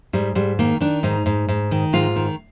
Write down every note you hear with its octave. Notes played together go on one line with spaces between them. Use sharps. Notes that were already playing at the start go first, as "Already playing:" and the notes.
G#2 G3
G#2 G3
D#3 A#3
D#3 D4
G#2 D#4
G#2
G#2
D#3
G#2 F4
D#3